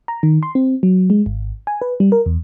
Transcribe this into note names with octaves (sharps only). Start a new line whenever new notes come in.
A#5
D#3
C6
C4
F#3
G#3
G#1
G#5
B4
G3
A#4
E2